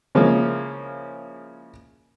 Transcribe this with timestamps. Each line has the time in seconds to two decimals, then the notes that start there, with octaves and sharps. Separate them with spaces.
0.15 C#3 F3 G#3 A#3 C#4 E4